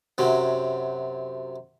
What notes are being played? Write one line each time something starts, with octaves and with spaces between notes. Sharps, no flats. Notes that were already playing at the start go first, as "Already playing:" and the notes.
F#2 C3 F#3